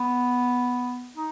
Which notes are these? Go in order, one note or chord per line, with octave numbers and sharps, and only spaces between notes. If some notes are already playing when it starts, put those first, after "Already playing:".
Already playing: B3
D#4